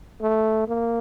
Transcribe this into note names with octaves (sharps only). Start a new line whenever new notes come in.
A3
A#3